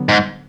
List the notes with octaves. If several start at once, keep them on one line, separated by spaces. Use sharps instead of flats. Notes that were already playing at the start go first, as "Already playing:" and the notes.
Already playing: D3 F#3 B3
G#2